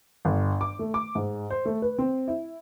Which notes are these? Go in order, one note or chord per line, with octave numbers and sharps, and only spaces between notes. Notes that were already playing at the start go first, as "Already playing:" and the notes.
G1
D6
A3
D6
G#2
C5
A3
B4
C4
E4